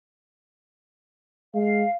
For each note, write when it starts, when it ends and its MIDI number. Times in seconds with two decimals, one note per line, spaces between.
1.54 1.84 56
1.54 1.92 77